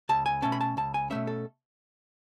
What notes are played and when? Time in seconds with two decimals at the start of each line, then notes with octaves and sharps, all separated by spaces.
0.09 C#2 A5
0.26 G#5
0.42 B2 A3 C#4 A5
0.52 B5
0.61 A5
0.77 C#2 A5
0.94 G#5
1.10 B2 A3 C#4 E5
1.27 A4